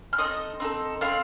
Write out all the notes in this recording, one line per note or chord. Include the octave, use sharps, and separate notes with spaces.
F6
C4 D#4 A4 D#5 D#6
C4 D#4 A4
C4 D#4 A4 F5 F6